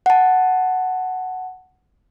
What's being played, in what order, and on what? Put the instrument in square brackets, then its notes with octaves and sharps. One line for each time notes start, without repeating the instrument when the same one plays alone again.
[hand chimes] F#5 A5